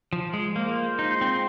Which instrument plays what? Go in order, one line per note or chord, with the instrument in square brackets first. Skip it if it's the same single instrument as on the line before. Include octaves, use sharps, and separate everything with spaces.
[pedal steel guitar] F3
G#3
[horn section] G#3 F4 C5 [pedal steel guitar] A#3
[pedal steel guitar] D#4
C4